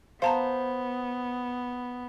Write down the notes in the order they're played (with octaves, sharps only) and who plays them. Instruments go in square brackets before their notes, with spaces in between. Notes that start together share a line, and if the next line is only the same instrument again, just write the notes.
[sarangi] B3 [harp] C5 [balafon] F5 A5 A#5